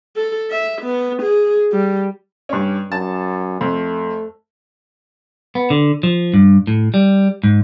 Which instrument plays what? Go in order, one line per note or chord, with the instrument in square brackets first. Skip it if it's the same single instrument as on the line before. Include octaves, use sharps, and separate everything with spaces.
[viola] A4
E5
B3
G#4
G3
[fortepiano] G2 C#4
[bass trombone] F#2 [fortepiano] A5
[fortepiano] F2 [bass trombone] A3
[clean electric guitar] B3
D3
F3
G2
A2
G3
G#2